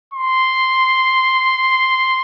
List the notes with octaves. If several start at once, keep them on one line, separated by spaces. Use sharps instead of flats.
C6